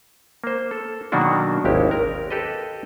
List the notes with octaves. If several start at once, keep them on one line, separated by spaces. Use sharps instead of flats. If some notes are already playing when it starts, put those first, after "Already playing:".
A#3 C5
A4
B2 D#3 F#3 A#3 D4 F#4
G#1 D#2 G#3 C#4 E4 G4
A#4
G4 A4 B4 D#5